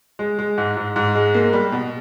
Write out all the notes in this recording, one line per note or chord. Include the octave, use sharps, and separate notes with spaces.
G#3
G#3
G#2
G#2
G#2
G#3
A#3
G3
B2